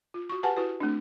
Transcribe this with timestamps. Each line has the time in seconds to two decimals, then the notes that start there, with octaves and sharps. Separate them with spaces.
0.14 F4
0.29 F#4 C#6
0.43 G4 B4 F#5 G#5 A5
0.57 E4 F#4 B4
0.80 A3 C4 D4